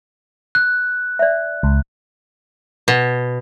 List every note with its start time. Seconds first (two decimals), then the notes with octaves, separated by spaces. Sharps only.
0.55 F#6
1.19 D5 E5
1.63 C#2
2.88 B2